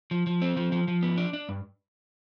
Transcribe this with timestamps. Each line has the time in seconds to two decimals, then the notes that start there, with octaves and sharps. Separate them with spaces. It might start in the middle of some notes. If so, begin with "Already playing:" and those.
0.11 F3
0.27 F3
0.42 C4
0.57 F3
0.72 F3
0.88 F3
1.03 B3
1.18 D4
1.33 D4
1.49 G2